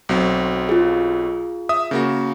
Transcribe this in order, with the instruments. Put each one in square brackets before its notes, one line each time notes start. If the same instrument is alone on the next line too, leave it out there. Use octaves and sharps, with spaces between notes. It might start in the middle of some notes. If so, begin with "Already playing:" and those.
[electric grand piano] B1 F#3 C4
[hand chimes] F4 G#4
[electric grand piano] E5 D#6
C#3 A#3 F#4